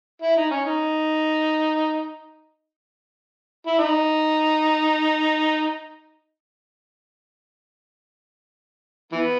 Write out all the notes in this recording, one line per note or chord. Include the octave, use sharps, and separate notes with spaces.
E4
D#4
C#4
D#4
E4
D#4
E3 B3